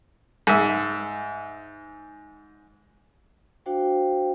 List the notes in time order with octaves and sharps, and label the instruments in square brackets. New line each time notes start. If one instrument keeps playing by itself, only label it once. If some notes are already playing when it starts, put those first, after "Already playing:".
[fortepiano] G#2 E5
[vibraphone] D4 F#4 C5 F5 G5